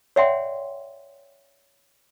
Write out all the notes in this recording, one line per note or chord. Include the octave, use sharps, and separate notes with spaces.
C#5 D5 E5 F#5 G5 C6